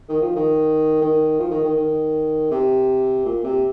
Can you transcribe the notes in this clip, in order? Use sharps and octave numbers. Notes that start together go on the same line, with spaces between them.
D#3
F3
D#3
D#3
F3
D#3
D#3
D#3
C3
A#2
C3